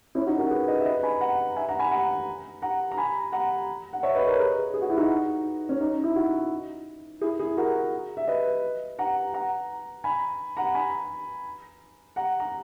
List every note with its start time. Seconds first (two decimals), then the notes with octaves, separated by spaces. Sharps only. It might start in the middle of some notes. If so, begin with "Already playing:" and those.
0.15 C#4 E4
0.26 D#4 F#4
0.38 F#4 A#4
0.51 G#4 B4
0.68 B4 D#5
0.80 E5
0.85 B4 D#5
1.03 G#5 B5
1.21 F#5 A#5
1.56 E5 G#5
1.69 F#5 A#5
1.79 G#5 B5
1.91 F#5 A#5
2.62 F#5 A#5
2.91 A#5
2.97 G#5 B5
3.32 F#5 A#5
3.93 F#5
4.03 C#5 E5
4.15 B4 D#5
4.27 A#4 C#5
4.39 G#4 B4
4.74 G#4
4.81 F#4
4.90 E4
4.97 D#4 F#4
5.69 C#4
5.81 D#4
6.04 E4
6.16 D#4 F#4
7.21 E4 G#4
7.39 E4 G#4
7.57 F#4 A#4
8.17 E5
8.27 B4 D#5
8.99 F#5 A#5
9.34 F#5 A#5
10.04 G#5 B5
10.57 F#5 A#5
10.74 G#5 B5
12.16 F#5 A#5
12.40 A#5